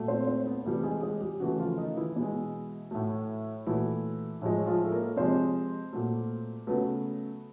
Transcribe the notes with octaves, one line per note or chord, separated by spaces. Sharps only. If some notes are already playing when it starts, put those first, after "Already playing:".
Already playing: A#2 F#3 A3
C4 C5
C4 C5
B3 B4
C3 E3 G3 A3 A4
G#3 G#4
G#3 G#4
G3 G4
C#3 E3 F#3 A3 F#4
F3 F4
D#3 D#4
E3 E4
B2 G#3
A2 F#3 A3
A#2 E3 F#3 A3 E4
A2 F3 G#3
F3 F4
A4
A#3 A#4
C3 F3 G#3 C4 C5
A#2 F#3 A3
C#3 F#3 A3 B3 B4